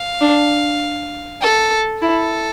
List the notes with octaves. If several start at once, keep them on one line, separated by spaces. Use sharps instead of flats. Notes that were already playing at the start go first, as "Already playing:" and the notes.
Already playing: F5
D4
A4
E4 A4